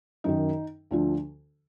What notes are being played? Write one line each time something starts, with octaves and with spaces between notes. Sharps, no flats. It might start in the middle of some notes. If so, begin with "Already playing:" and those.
F#2 D#3 D#4
D2 D3 F3